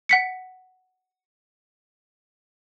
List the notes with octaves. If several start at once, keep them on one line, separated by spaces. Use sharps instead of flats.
F#5 B6 C#7